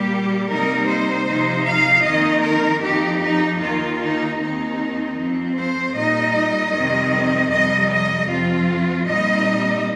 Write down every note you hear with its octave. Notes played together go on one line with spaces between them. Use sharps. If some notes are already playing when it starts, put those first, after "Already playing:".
Already playing: A#2 G3 A#3 G4
C3 G3 A#3 D#4 A#4
C5
C3 F3 D#4
F5
F2 D#3 A#3 D#4 D#5
A#4
F2 F3 D#4 G4
D#4
D#2 D#3 A#3 D#4 F4
D#4
D#2 D#3 C4 D#4
F2 F3 C4
C5
A#2 G3 D#4 D#5
F2 C3 D#3 G3 C4
F2 C3 G3 D#5
D#5
F2 F3 C4 F4
A#2 G3 C4 D#4 D#5